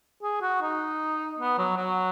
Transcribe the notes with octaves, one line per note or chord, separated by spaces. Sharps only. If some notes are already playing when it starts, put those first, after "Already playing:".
G#4
F#4
D#4
B3
F#3
F#3